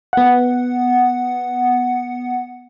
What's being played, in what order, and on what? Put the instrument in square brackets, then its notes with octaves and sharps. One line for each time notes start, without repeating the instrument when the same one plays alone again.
[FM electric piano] B3 F#5